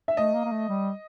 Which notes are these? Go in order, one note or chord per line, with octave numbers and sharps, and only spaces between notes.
E5
A3 D#5
A#3
A#3
A3
G3